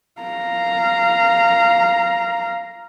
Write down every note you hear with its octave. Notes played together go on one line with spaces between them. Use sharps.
F5 A#5